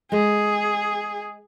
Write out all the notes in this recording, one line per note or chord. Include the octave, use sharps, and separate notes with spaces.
G#3 G#4